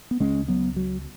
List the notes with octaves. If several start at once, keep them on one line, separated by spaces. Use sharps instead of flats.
B3
C#2 C#3 G#3 C#4
F#3 B3
F#3